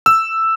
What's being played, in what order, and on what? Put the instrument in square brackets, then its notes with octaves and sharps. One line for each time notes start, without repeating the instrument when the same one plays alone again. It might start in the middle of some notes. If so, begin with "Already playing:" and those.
[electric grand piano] E6